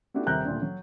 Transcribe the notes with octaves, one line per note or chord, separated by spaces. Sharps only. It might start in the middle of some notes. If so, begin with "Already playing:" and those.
A3 B3 D4 E4 F#4 G4
D#1 C3 A#4 A#5 F#6 G6
D2 A#2 D4
F#3